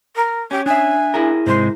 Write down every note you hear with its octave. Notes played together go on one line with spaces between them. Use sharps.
A#4
C#4 G4
D4 E5 G#5
E4 G#4 A#4
G#2 C3 G#3 C5